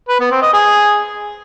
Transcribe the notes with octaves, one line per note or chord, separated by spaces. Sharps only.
B4
B3
C4
D#5
G#4